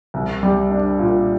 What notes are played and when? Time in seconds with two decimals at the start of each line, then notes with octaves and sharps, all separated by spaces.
0.14 C2
0.43 G3
0.71 D4
0.99 A#2